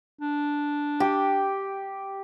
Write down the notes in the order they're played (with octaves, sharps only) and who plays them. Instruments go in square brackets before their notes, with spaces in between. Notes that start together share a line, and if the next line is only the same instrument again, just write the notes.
[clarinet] D4
[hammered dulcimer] G4